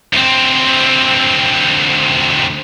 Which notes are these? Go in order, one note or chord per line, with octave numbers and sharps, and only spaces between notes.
D2 C4